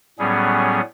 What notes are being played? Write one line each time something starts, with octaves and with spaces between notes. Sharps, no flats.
A2 F#3 G3 B3 C#4 G#4